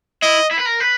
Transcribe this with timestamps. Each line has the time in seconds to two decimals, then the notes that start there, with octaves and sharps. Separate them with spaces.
0.22 E4 D#5
0.51 E4
0.59 B4
0.66 A#4
0.80 B4